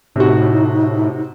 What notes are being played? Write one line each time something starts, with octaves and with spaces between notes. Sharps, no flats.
A2 C3 D#4 F#4